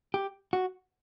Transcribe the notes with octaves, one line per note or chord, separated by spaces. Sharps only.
G4
F#4